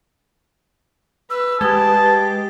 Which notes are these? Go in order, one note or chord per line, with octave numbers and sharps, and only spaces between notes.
B4 E6
G#3 G4 B4 A5
G4